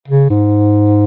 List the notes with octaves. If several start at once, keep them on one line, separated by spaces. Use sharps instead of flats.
C#3
G#2